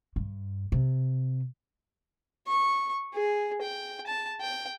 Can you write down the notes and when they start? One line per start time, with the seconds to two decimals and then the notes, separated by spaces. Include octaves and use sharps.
0.16 G2
0.72 C3
2.47 C#6
3.14 G#4
3.62 G5
4.07 A5
4.41 G5